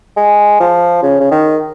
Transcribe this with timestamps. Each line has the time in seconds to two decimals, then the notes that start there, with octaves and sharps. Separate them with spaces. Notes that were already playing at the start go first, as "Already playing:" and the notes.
0.17 G#3
0.60 F3
1.03 C#3
1.20 C#3
1.31 D#3